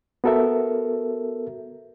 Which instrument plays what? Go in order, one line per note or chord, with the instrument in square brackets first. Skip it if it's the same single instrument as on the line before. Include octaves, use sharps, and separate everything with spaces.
[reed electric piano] B3 F#4 A4 A#4 E5